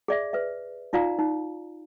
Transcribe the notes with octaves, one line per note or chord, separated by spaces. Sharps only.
G#4 D5 E5
B4 E5
D#4 F4 D5 F5 A#5
D#4